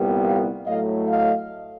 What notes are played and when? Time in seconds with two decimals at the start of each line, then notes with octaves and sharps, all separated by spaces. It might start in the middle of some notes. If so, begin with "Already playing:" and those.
Already playing: C2 A#2 G3 B3
0.23 F5 G5
0.66 A2 F#3 A3 D#5 F5
1.08 D#5 F5